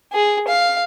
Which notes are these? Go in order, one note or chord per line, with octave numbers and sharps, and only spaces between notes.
G#4
F5